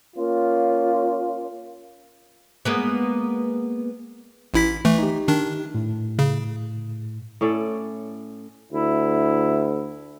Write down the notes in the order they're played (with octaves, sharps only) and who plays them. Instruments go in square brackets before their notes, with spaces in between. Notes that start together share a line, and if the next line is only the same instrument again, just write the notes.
[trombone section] A#3 C#4 F4
[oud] G#3 A#3 B3
[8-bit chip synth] A1 E4 B6
E3 A3
[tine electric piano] D#4 G4
[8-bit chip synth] D#3 D4
[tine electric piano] A2
[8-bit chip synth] C#3
[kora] A2 C#4 A4 D5
[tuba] D2 [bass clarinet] E4